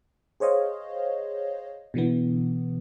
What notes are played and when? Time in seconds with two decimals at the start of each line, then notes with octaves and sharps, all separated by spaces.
0.40 G#4 C5 C#5 D#5 F5
1.94 B2 D3 E3 B3